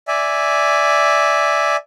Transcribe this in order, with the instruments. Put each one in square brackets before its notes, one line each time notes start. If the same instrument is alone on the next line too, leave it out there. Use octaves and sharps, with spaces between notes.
[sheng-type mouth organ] D5 E5 G#5